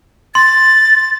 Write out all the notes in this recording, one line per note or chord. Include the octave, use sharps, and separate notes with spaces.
C6 A6